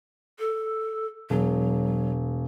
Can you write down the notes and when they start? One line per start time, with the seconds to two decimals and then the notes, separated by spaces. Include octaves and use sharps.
0.39 A4
1.30 E1 F#3